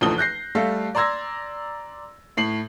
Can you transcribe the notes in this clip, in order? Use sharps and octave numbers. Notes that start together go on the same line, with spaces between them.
F1 D2 E3 F3 D#6 G7
F#6 G6 A#6 C7
G3 A3 A4 F5
D5 A#5 C6 E6 G#6 A#6
A2 C7 F#7